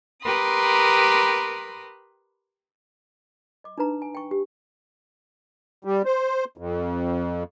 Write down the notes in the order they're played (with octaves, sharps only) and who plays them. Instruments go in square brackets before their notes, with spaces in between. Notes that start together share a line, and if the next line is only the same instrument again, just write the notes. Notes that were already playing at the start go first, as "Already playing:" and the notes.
[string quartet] G4 A#4 B4 B5 C6 D#6
[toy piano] D#5 D6
D4 D#4 B4 A#5
G#5
G5 C#6
G4
[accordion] G3
C5
F2